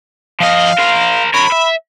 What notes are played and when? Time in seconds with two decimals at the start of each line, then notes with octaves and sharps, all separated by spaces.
0.40 F3 D#5 F5
0.79 A#4 C5
1.34 A#4 C#5 B5
1.51 E5